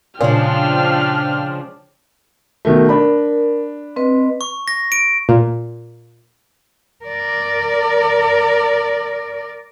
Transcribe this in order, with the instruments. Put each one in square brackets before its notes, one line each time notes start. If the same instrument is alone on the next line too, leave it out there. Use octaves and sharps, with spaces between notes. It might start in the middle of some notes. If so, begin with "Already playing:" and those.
[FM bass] A#2 [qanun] C#3 G#3 [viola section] F3 D4 [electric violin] G5 F6
[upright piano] B2 D#3 A3 [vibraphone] A#4
[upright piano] D4 B5
[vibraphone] C4 B4 D#5
[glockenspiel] C#6
A#6
D7
[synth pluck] A#2
[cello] A#4 D5